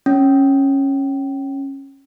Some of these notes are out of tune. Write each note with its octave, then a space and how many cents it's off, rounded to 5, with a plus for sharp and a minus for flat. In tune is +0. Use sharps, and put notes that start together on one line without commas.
C#4 -15